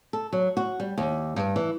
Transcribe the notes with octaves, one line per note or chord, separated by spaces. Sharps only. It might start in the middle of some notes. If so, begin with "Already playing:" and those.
A4
F#3
F#4
G3
D#2
G2
E3